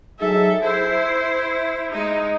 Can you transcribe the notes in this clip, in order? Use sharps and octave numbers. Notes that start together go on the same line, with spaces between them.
F#3 D#4 G#4 A4 E5
E4 C5 E5
G#3 D#4 D#5